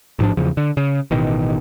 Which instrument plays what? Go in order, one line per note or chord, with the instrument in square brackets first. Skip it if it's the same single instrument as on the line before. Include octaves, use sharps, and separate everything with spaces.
[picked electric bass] A1 G#2 F3 D4
E2 C#3 F3
D3
C#3
A1 B2 D#3